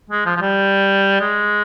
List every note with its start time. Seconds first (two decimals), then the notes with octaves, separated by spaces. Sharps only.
0.10 G#3
0.26 F3
0.37 F3
0.41 G3
1.20 G#3